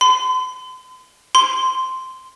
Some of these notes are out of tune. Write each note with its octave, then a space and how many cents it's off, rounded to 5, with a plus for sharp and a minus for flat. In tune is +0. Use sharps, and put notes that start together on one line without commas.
C6 -45
C6 -5